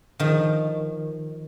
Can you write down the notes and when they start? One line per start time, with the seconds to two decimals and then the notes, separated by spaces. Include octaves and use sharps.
0.19 D#3 F3